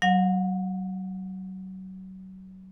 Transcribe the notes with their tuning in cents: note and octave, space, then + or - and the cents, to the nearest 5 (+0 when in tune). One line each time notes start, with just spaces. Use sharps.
F#3 +30 F#5 -45